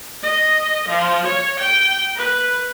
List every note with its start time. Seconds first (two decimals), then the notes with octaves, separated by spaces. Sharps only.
0.22 D#5
0.88 F3
1.26 C#5
1.59 G5
2.16 B4